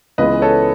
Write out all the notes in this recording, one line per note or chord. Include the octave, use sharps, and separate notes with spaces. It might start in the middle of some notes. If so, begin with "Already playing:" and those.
C#2 C#3 E3 G#3 B3 B4 D#5
A4 C#5